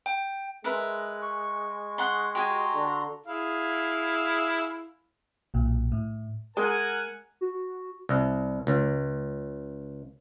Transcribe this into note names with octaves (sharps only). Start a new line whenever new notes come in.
G5
G#3 A#4 B4 E5
C#6
F#5 C6
F#4 G4 G#5 A#5 C6
D3
E4 G#4 F5
B1 A#2
A2
G#3 A#4 F#5 G#5
F#4
C2
C#2